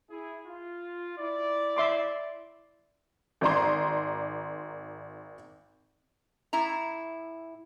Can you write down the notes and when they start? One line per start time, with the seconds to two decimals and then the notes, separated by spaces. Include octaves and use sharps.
0.10 E4 G#4
0.46 F4
1.18 E4 D5
1.77 E5 C6 D6
3.41 G#1 D5 A#5 C6
6.53 A2 E4 A#5